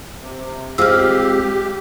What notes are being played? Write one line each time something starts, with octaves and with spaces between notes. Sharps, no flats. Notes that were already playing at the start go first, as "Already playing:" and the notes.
C3
G#3 C4 F4 G4 E6 F6